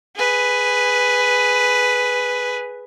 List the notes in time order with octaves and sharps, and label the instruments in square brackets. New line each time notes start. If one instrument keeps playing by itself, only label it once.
[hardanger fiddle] G#4 B4